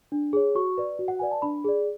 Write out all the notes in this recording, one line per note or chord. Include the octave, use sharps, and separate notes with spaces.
D4
G#4 C#5
F#4 C#6
B4 D5
F#4
F#5
B4 D5 G#5
A5
D4 B5
G#4 D5